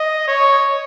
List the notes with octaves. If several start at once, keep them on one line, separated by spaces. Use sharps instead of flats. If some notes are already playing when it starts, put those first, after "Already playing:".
Already playing: D#5
C#5